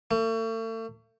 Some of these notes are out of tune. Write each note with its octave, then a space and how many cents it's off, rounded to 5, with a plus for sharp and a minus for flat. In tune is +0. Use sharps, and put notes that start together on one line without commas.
A3 +40